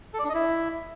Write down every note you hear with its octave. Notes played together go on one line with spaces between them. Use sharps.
A4
D5
D4
D#5
E4